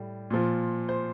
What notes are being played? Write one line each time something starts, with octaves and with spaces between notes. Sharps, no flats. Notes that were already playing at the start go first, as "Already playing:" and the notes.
Already playing: A2 G3
A#2 F3
C5